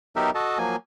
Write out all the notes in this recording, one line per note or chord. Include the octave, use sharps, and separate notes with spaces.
F#3 B3 D#4 G4 A#4 E5
F#4 A4 D#5 A5
F3 F#3 A#3 G#5